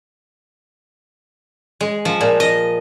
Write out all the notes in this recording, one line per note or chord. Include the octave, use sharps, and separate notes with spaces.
G#3
F3
A#2
D#5